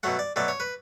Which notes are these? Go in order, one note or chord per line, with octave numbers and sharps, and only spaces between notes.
B2 F#3 A3 F#5
D5
B2 F#3 A3 D5
C#5
B4